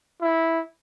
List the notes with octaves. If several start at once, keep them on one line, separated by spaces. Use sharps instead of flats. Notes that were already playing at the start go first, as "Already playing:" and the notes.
E4